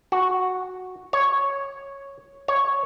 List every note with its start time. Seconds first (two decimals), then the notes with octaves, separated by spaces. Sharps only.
0.12 F#4
1.13 C#5
2.48 C#5